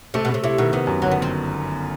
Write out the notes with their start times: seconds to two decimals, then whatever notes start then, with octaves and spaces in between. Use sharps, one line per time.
0.14 C3 A3
0.25 B2
0.29 C3 A3
0.44 C3 E4
0.58 B2 D#3
0.72 C3 B3
0.87 F#2
1.02 G1 F#3
1.11 B3
1.22 C4